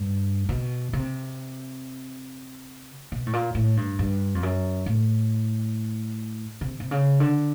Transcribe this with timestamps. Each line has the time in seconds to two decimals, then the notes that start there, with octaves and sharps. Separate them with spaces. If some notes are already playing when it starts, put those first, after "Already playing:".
Already playing: G2
0.49 B2
0.93 C3
3.12 B2
3.26 A2
3.33 A#2
3.55 A2
3.77 G2
3.99 G2
4.35 F2
4.43 F#2
4.86 A2
6.61 C3
6.80 C3
6.91 C#3
7.20 D3